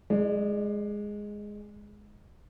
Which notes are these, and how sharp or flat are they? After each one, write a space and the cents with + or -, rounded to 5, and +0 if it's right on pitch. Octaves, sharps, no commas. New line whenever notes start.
G#3 +0 D5 +30